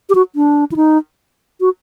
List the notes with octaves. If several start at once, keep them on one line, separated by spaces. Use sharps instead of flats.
G4
F#4
D4
E4
D#4
F#4